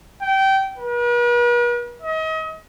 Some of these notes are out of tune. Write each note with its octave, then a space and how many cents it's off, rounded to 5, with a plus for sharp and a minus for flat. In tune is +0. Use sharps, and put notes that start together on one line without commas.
G5 -20
B4 -45
D#5 +35